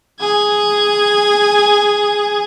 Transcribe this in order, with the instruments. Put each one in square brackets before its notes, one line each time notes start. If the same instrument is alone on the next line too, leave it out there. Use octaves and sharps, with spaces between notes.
[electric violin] G#4 G#6